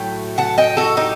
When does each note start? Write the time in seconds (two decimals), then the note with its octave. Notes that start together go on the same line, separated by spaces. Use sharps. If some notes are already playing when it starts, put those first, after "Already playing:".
Already playing: A2 F#3 A3 G5
0.38 F#5 A5
0.58 D#5 G5
0.77 F#4 A4
0.97 D#4 G4